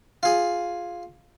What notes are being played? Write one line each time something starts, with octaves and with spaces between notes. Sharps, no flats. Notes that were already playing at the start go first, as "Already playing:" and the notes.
F4 G#4